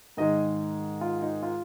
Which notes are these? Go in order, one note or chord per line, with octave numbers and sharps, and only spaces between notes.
G#2 D#3 G#3 D#5
F4
D#4
F4